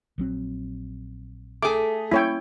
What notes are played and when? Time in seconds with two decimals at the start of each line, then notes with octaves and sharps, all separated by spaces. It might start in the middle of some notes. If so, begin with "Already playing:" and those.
0.18 A#1 F#3 C4
1.62 A3 G#4 D6
2.11 G3 A#3 C#4 E4 C#5 G5